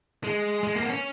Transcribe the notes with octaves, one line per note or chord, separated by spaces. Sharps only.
G#3
G#3
A#3
B3
C#4